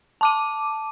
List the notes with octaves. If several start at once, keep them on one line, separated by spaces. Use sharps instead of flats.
A5 D6 D#7